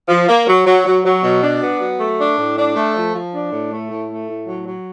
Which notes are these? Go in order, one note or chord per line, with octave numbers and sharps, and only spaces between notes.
F3
A#3
F#3
F#3
F#3
F#3
B2
D4
B3
F#3
A3
D4
A2
D4
A3
F3
F3
D4
A2
A3
A2
A3
A2
F#3
F#3